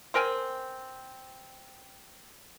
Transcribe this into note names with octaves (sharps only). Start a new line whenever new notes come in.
C4 A#4 G5 G#5